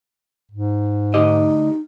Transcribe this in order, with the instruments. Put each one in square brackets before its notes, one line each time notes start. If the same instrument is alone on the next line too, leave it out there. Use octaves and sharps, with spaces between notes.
[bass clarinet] G#2
[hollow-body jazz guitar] D2 G4 D#5 [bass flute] D#4